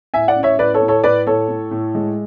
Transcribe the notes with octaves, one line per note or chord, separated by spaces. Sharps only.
A2 E5 G#5
D5 F#5
C#4
C#5 E5
A2 B4 D5
A4 C#5
A2
A4 C#5
A2 B4 D5
A2 A4 C#5
A2
A2
G#3